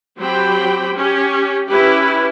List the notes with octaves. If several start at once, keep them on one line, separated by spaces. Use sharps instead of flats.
F#3 C4 G4 C5 G5 B5
C#4 G4
C#4 E4 G4 B4